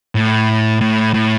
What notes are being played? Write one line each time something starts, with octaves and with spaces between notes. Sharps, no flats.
A2
A2
A2